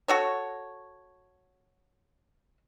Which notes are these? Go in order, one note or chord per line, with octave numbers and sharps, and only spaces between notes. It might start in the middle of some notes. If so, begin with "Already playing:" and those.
F#4 A4 C#5